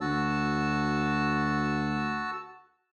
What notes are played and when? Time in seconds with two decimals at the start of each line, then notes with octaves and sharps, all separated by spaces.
0.01 D2 F#4 A5 E6